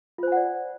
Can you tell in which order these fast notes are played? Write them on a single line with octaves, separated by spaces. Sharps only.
F4 C5 G#5 F#5 D5